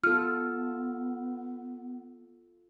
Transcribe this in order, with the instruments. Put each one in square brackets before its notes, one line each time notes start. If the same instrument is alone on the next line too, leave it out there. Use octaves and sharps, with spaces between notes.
[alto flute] B3 [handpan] F4 A4 [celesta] F6